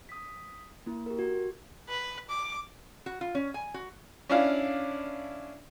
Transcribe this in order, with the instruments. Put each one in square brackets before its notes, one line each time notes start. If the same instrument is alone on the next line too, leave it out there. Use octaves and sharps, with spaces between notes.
[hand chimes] D#6 B6
A#3 E4
G4 A#4
F#4
[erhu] B4
D6
[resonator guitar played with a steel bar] F#4
F4
C#4
G#5
F#4
[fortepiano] C#4 D4 E4 D5 F5